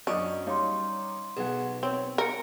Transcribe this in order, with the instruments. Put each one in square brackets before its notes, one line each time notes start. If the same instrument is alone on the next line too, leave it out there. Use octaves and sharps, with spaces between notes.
[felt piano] F#2 F#3 [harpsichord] C#4 [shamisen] D4 [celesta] D#5 C#6 D#6
[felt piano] G3 D#4 C#5 [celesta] F5 C6
[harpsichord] B1 [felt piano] G#4 F#5
[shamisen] C4 [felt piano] C#5
[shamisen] A#4 [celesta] C#7 D7